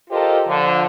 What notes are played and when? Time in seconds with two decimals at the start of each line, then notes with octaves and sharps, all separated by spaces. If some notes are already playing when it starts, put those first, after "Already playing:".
0.10 F4 G4 A4 A#4 C5 D#5
0.47 D3 F3